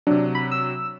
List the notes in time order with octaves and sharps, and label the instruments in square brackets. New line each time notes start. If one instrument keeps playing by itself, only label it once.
[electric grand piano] C3 F#3 [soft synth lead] D4
[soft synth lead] B5
E6